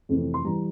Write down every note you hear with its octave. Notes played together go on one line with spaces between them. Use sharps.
F2 C3 E3 A3 C4
C6
E3 G3 A#5